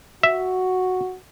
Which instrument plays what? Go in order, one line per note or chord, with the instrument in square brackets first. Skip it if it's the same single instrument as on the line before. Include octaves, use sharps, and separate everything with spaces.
[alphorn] F#4 [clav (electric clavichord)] E5